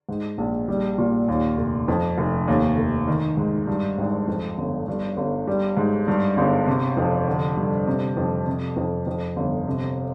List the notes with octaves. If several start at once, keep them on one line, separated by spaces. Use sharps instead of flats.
G#2
A#1
G3
A#2
D#2
F1
F2
F1
D#2
F1
D#3
G#2
G2
G#1
F2
G1
G2
G1
G3
G#2
G2
G1
C3
F2
D3
G2
C3
F2
C3
F2
F2
G1
C3